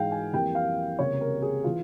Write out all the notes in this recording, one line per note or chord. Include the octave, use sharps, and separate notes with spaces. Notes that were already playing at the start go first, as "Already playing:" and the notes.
Already playing: G#2 E3 G#3 F5 G5
G#5
F2 E3 G3 A#3 G5
F5
C#2 C3 G3 A#3 C#5
A#4
G#4
E3 F4